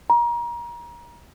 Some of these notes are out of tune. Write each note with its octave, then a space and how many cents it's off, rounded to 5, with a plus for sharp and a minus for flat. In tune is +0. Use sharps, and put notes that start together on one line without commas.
A#5 +30